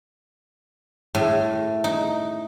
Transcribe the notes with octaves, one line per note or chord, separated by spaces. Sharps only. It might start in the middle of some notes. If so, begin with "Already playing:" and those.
A2
D#4